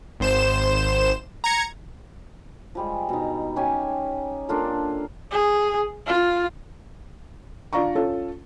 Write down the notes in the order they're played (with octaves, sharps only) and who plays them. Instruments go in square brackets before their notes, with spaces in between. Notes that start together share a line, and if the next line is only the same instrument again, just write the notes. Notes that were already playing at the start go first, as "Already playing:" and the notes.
[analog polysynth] G#1 C5 E7
A#5 G#6 C#7
[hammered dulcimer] F3 G3 G#3
B2 D#4
C#4 G4 G#5
A#3 D4 F4 A4
[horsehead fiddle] G#4
F4
[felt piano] D4 F4 D5 F5 A#5 C#6
C#4 F4 A4